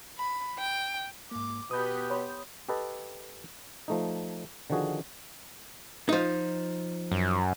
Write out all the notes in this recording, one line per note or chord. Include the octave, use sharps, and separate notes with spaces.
B5
G5
G#2 A#3 D6
B2 B3 G4 B4 D#6 G6
C#5 B5 C6
G4 A4 B4 D#5 A5
F3 A3 D#4
D3 D#3 F3 F#4 G#4
F3 D#4
F#2